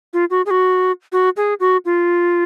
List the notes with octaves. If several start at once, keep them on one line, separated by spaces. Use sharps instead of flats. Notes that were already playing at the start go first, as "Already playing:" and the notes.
F4
F#4
G#4
F#4
F#4
G#4
F#4
F4